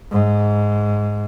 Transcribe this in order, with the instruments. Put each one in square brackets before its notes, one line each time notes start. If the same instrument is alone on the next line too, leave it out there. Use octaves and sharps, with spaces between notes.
[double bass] G#2